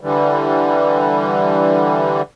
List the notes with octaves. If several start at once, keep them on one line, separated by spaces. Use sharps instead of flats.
D3 E3 G3